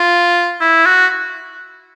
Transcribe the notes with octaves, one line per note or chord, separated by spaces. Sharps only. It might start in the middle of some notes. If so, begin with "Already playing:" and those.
Already playing: F4
E4
F#4